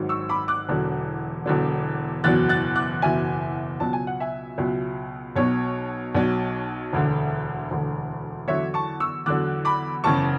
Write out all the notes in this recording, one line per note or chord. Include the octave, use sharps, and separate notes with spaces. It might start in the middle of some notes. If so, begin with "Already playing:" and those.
Already playing: G#1 G#2 F#3
C#6 E6
B5 D6
D6 F#6
E1 E2 D3 F#3
E1 E2 D3 F#3
F#1 E2 B2 F#3 F#6 A6
F#6 A6
D6 F#6
F#1 E2 B2 F#3 E5 G#5
C#2 B2 F#3 A5
G#5
F#5
E5 G#5
C#2 B2 F#3
B1 B2 F#3 C#5
B1 B2 F#3
E1 D2 D3
E1 D2 D3
E2 D3 F#3 C#5 E5
A5 C#6
C#6 E6
E2 D3 F#3 D6 F#6
B5 D6
F#1 E2 C#3 A5 C#6